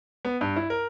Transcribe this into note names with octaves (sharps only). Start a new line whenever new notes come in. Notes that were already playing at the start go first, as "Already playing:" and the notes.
B3
G2
E4
A#4